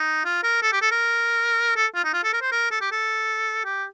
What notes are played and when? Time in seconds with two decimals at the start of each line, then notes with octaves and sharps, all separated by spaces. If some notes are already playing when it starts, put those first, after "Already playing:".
Already playing: D#4
0.25 F4
0.44 A#4
0.62 A4
0.72 G4
0.82 A4
0.91 A#4
1.76 A4
1.95 F4
2.05 D#4
2.14 F4
2.24 A4
2.33 A#4
2.42 C5
2.52 A#4
2.71 A4
2.81 G4
2.92 A4
3.65 G4